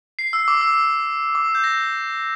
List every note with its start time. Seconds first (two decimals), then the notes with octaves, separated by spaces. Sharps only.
0.19 C7
0.33 E6
0.48 D6
0.61 E6
1.35 D6
1.55 G6
1.64 A#6